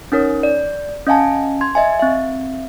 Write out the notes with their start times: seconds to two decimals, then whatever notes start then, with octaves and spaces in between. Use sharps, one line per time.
0.12 C#4 D#4 A#4 C#5
0.43 D5
1.07 C#4 D#5 F5 G#5 A5
1.61 C6 G#6
1.75 D#5 E5 G#5
1.99 C4 E5